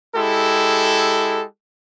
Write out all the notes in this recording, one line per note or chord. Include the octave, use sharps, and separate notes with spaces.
G#3 E4 G4 A4